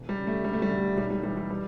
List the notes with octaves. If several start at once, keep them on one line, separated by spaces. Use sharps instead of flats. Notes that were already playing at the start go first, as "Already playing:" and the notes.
Already playing: E1
G3
C#3
A3
D2 G3
A3
G3
D2
B1 G3
G3
E3 G3
G3
G3